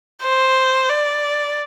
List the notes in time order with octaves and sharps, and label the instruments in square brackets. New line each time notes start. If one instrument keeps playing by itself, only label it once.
[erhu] C5
D5